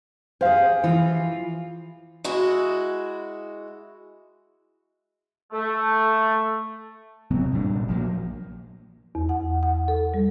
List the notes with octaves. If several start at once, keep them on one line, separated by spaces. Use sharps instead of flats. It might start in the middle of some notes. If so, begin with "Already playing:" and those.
G4 G#4 C5 F5
E3 F3 F4
G#3 E4 F#4
A3
C3 F#3 B3 C4
G1 A#2 G3 D4
A#1 F3 F#3 A#3
E2
F#5
F#5
A4
G3